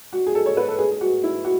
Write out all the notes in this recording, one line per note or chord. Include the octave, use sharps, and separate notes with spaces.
F#4
G#4
A4
C#5
B4
A4
G#4
G#4
F#4
E4
F#4